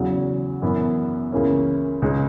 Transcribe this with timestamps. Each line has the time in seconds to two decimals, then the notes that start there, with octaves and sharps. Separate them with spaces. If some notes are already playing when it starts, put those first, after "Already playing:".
Already playing: E2 C#3 F#3
0.62 F#2 E3 B3 E4
1.32 C#2 C#3 E3 A#3 C#4
2.02 C#2 C#3 G#3 D#4